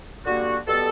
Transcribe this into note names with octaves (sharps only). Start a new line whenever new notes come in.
D3 G3 A#3 F#4
B2 G3 B3 A4